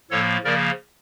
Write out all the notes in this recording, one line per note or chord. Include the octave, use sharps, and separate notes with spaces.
A2 F3 A#3 A4 C#5
C#3 F3 A#3 A#4 D5